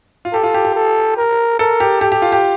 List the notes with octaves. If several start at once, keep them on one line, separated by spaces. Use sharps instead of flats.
F4
G4 A4
F4
G4
G4
A4
A#4
A4 A#4
G4
G4 A4
G4
F4
G4